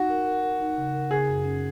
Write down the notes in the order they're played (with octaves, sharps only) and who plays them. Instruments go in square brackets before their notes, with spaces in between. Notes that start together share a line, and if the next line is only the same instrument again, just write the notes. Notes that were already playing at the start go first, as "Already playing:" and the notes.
Already playing: [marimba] D#4 [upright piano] F#4
[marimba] A#4
A#4
A#4
D#4
C#3
A#4
[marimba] C#3 [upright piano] G#4
[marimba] F#2
C#4